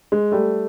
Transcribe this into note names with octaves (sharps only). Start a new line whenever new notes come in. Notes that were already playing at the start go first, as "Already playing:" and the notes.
G#3
G3 A3